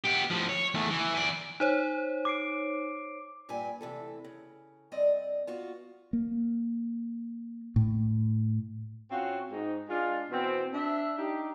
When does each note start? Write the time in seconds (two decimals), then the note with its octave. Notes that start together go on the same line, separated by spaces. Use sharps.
0.05 B3 G4
0.31 A2 F3
0.49 C#5
0.74 E2 A3
0.90 E3
1.14 E3 D5
1.60 D#4 C5 C#5
2.25 D6 C7 D7
3.49 G2 A#2 G4 B4 G#5
3.81 D2 C3 E3 A4
4.25 C#3
4.92 G2 C4 D5 D#5
5.47 B3 F4 F#4
6.13 A#3
7.76 A2
9.11 C4 C#4 F4 F#4
9.52 G#2 D#4
9.89 G#3 D4 F4
10.30 B2 E3 B3 C4
10.74 D4 E5
11.18 D4 D#4 G4